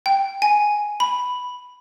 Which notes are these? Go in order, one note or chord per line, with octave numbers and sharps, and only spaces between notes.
G5
G#5
B5